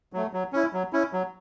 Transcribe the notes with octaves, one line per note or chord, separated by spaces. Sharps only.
F#3 A3
F#3
C#4 E4
F#3
C#4 E4
F#3